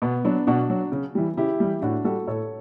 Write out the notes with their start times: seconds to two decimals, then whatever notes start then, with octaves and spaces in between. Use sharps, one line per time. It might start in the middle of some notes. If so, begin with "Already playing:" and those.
0.02 B2 B3
0.25 F#3 B3 D4
0.47 B2 D4 F#4
0.70 F#3
0.92 C#3
1.15 E3 G3
1.37 C#3 E4 G4
1.60 E3 G3
1.82 A2 D4 F#4
2.04 G3 F#4 A4
2.27 A2 A4 C#5